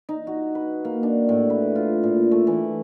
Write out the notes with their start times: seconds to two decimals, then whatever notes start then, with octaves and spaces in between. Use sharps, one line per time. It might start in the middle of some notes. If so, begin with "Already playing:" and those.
0.09 D#4
0.27 F#4
0.55 B4
0.85 A#3
1.03 D4
1.29 A2
1.50 B4
1.76 F4
2.03 A#2
2.31 A3
2.47 E3